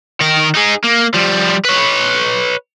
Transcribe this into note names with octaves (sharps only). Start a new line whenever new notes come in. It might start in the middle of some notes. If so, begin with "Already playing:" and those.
D#3 A#4
D#4 G#4
A#3
F3 G3
B4 C#5